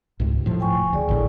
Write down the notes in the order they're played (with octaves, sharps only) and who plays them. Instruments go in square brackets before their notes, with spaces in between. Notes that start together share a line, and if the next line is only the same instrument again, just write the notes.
[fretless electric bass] C#2 G#2 C3
D#1 A2 F3
[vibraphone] G5 G#5 C#6
[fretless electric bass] D2 [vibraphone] G#4 D5
[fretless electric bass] A1 A2 D3